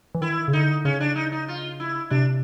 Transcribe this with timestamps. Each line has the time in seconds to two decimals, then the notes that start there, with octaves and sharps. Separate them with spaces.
0.15 E3
0.21 D#3 E4
0.48 C#3
0.53 D3 D#4
0.85 C#3 C#4
1.00 D4
1.16 D#4
1.32 D#4
1.48 F4
1.80 E4
2.10 C3 D4